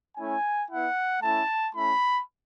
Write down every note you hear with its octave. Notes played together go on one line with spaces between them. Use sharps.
A3 C#4 E4 G#5
B3 E4 F#5
A3 C#4 E4 A5
A3 C#4 E4 B5